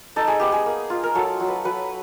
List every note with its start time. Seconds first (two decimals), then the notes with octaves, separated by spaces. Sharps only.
0.16 D#4 A4
0.28 G#4
0.40 B3 G4
0.52 G#4
0.66 A#3
0.90 F4
1.03 A#4
1.15 F#3 A4
1.40 F#3
1.48 B4
1.65 F#3 B4